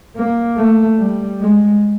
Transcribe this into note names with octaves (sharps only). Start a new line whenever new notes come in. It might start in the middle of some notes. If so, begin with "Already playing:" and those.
A#3
A3
G3
G#3